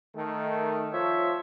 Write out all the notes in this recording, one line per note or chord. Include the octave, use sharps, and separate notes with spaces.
D#3 A3
F3 C5 C#5 E5